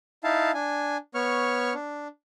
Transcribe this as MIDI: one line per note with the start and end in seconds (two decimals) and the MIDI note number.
0.24 0.51 63
0.24 0.51 64
0.24 0.51 77
0.24 0.51 81
0.54 0.97 62
0.54 0.97 80
1.15 1.73 59
1.15 1.73 73
1.15 1.73 85
1.15 1.73 89
1.74 2.08 62